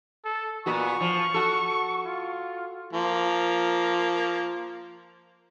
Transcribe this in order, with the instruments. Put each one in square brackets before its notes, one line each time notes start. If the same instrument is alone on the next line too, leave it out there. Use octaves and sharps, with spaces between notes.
[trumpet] A4
[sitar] A#2 B3 F#4 [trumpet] C#6
[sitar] F3
F#4 A4
[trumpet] F4
[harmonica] F3 A#3